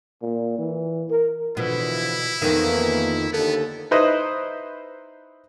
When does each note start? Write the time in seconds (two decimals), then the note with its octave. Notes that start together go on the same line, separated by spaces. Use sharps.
0.22 A#2
0.58 E3
1.11 A#4
1.57 B2 D3 E3 F3 E4
2.42 F2 D#3 E3 A#3 B3
3.33 D#2 D3 B3 A4
3.91 D#4 E4 B4 C5 D#5